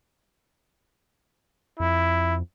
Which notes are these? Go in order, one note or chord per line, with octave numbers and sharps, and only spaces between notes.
F2 E4